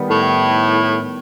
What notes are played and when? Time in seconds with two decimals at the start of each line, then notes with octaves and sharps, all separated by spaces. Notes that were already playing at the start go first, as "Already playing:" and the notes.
Already playing: D#3 G3 B3
0.08 A2